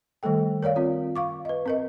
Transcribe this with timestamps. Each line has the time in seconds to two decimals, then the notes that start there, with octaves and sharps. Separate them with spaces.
0.23 D#3 G3 A3 A4 G5
0.63 A#4 C#5 D5 F5
0.76 C4 F4
1.16 F5 C#6 D6
1.45 B4 D#5
1.66 C4 A#4 D#5